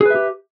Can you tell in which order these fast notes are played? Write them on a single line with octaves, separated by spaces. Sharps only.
G#4 B4 E5 G4